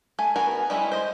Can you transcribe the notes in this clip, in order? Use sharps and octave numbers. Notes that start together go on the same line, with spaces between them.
A3 G#5
B3 F#4 A#4 G#5
G3 G#3 C4 C#4 E4
C5 D#5